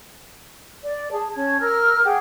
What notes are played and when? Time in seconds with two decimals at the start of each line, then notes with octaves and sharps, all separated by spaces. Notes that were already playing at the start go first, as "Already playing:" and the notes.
0.83 D5
1.11 G#4 A5
1.35 C#4 A5 G#6
1.60 A#4 E6 F6
2.04 G#4 F#5 G5 D6